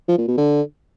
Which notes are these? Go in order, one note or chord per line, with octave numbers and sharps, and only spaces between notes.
F3
A#2
B2
D3